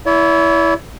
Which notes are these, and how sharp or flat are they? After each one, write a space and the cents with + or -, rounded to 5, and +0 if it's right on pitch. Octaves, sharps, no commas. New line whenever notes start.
E4 +0 C#5 +45